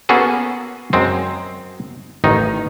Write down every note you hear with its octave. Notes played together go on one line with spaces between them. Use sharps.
A#3 B3 C#4 F#4 G#4 A4
F#2 G#3 C4
A1 D#3 D#4